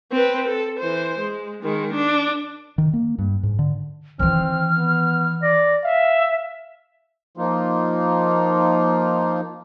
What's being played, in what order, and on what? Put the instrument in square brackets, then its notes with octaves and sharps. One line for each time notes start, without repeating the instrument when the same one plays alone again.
[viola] C4 B4
A4
E3 C5
G#3
D#3 G#3
D4
[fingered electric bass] D#3
A#3
G2
G#2
D3
[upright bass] D#3 E3 [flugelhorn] C4 [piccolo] F6
[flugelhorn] B3
[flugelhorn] D5 [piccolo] A#6
[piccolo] E5 [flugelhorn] F5
[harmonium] F3 A#3 D#4 F4